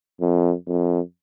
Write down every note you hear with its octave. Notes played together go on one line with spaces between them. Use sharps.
F2
F2